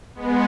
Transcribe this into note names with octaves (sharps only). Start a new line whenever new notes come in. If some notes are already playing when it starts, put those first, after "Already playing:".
G#3 B3